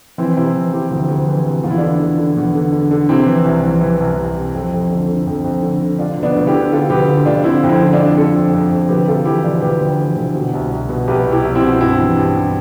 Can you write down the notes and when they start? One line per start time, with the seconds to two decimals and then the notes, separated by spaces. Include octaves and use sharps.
0.18 E3 C4 E4
0.37 C3 C4 E4
0.54 E3
0.73 E3 E4 G4
0.91 D2
1.09 D2
1.27 E3
1.46 C3
1.64 E2 F4
1.70 E4
1.78 D3 D4 F4
1.99 D3
2.18 D3
2.37 E2
2.55 D3
2.72 D3
2.91 D3
3.09 C3 C4 E4
3.26 E3
3.45 C2
3.64 E3
3.81 E3
4.00 C2
4.17 C2
4.35 C3
4.55 F2
4.73 F2
4.90 D3
5.08 D3
5.26 F2
5.44 F2
5.62 D3
5.80 D3
5.99 D3 D4 F4
6.17 D2
6.23 B3 D4
6.36 D2
6.47 E4 G4
6.53 D3
6.72 D3 F4 A4
6.90 D2 G4 B4
7.08 D3
7.26 D2 D4 F4
7.44 D3 C4 E4
7.63 F2
7.69 C4 E4
7.81 D3
7.93 D4 F4
7.99 F2
8.18 D3 F4 A4
8.35 F2
8.54 F2
8.71 F2
8.89 D2 G4 B4
9.07 C3 F4 A4
9.25 E3 E4 G4
9.44 D2 D4 F4
9.62 D2 G4 B4
9.81 D2
9.99 E3
10.16 D2
10.35 B2
10.53 C2
10.72 C2
10.89 B2
11.08 C2 G4 B4
11.26 C2
11.31 E4 G4
11.43 C2
11.55 C4 E4
11.62 B2
11.80 G2 C4 E4
11.99 E3
12.17 G2
12.35 G2